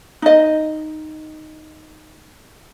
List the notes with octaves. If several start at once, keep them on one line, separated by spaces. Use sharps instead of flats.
D#4 D#5